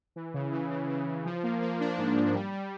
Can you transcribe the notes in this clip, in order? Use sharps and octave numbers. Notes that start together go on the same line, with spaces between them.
E3
C#3
E3
C#3
C#3
C#3
F3
A#3
A#3
D4
G#2
G#2
G3
G3